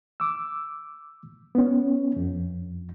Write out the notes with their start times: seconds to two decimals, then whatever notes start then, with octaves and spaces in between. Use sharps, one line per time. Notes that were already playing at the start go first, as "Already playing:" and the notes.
0.20 D6 E6
1.55 B3 C#4
2.16 F2